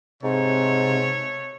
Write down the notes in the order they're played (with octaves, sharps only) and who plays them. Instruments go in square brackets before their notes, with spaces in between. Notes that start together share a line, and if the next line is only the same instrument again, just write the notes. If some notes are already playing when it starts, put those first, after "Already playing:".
[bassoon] G#2 [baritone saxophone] C3 [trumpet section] A3 C#5